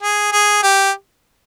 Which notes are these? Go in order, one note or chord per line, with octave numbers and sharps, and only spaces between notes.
G#4
G#4
G4